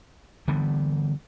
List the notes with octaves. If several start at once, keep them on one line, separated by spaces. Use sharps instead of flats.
D3 E3 G3 B3